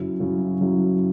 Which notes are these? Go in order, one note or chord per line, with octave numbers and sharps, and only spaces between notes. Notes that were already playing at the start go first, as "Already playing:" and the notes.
Already playing: F#2 C#3 F#3 C#4 E4
F#2 C#3 F#3 C#4 E4
F#2 C#3 F#3 C#4 E4